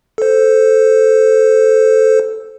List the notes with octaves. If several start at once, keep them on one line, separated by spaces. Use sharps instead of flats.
A4 C5